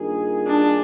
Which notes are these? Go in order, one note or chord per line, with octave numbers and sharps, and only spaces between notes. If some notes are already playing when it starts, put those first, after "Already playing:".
Already playing: G2 D#3 A#3 F4 G#4
D4